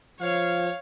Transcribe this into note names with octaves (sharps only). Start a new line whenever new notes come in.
F3 C#5 F5